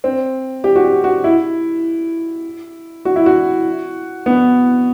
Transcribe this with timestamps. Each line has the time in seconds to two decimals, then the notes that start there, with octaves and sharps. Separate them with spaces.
0.04 C4
0.64 G4
0.76 F#4
0.84 G4
1.04 F#4
1.24 E4
3.05 F#4
3.16 E4
3.26 F#4
4.26 B3